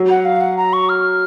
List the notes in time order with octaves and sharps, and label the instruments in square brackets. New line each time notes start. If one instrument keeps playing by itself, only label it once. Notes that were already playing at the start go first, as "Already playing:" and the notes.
Already playing: [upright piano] F#3
[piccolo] F#5
F5
F#5
A#5
C#6
F6